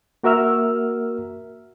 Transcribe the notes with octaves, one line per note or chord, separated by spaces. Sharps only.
A#3 F#4 A#4 E5 E6 F6